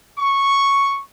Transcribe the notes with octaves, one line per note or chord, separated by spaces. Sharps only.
C#6